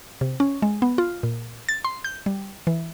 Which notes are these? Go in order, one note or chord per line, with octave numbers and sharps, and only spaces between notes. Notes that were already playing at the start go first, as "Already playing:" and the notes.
C3
C#4
G#3
B3
F4
A#2
A6
C6
G6
G3
E3